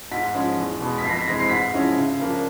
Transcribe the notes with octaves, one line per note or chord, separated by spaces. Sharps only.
G#2 B6
F3 G#3 C#4
E2
B2 G#3
B6
F2 C7
A#6
B6
C3 E3 G#3 C4 A#6
C7
G#2 B6
F3 G#3 C#4 E4
C#3
F3 A#3 D4